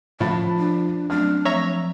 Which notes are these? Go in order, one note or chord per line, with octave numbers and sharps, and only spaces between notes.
A2 F3 A5 B5 A6
D4
F#3 A3 C4 D4 F6
F3 A3 C4 C#5 E5 A#5